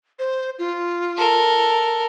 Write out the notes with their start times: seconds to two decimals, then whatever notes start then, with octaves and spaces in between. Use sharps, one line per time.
0.19 C5
0.59 F4
1.17 A4 A#4